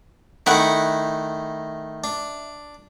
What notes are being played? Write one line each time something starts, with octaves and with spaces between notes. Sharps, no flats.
D#3 A3 D#4 E4 F#5
D4